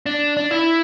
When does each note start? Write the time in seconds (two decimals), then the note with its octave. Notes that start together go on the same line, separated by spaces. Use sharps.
0.06 D4
0.37 D4
0.51 E4